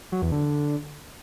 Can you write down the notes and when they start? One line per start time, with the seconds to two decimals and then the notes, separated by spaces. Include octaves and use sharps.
0.12 F#3
0.22 E2
0.32 D3